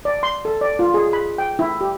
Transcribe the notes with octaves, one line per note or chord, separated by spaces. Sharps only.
D5
C6
A4
D5
F4
G#4
B5
G5
E4
G4